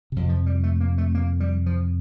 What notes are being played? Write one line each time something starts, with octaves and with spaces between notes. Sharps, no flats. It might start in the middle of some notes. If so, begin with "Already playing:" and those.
F2 C3
F3
G3
A3
A#3
A3
A#3
G3
F3